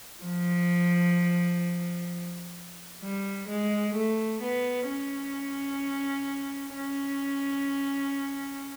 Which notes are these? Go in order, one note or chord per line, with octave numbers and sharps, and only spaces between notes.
F3
G3
G#3
A3
B3
C#4
C#4